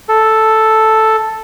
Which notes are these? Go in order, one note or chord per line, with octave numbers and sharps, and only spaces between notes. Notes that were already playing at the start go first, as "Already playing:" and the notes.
A4